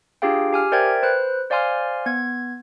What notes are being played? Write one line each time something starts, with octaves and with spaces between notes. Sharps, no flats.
D4 F4 G4 G#4 F5 G5
G4 G#5 F6
A#4 C5 D5 E5 G5 G#6
B4 C5 F#6
C5 D5 F5 G#5 C6 F6
B3 G#6